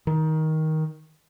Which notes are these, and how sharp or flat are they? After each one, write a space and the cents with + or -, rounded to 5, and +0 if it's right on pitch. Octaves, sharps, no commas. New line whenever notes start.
D#3 +15